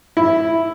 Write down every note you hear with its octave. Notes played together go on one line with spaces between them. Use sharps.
E4